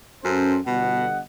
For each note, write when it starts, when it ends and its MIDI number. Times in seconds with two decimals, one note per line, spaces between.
0.24 0.58 42
0.24 0.60 61
0.24 0.60 69
0.24 0.60 72
0.67 1.21 31
0.67 1.07 47
0.67 1.21 75
0.67 1.21 78